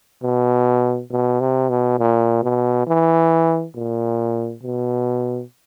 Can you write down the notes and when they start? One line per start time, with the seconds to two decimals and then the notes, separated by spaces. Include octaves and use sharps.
0.23 B2
1.11 B2
1.40 C3
1.70 B2
1.99 A#2
2.43 B2
2.87 E3
3.76 A#2
4.63 B2